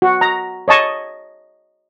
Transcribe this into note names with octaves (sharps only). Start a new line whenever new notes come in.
F#4
A#5
C#5 D#5 A5 C#6